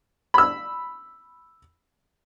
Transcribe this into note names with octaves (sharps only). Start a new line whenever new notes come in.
B5 E6